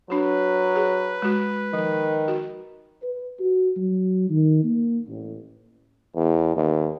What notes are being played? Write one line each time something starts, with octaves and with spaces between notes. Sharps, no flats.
F#3 D4 F#4 B4
G#4
G#3 F#4
D#3 F3
F#4
B4
F#4
F#3
D#3
A#3
A1
E2
D#2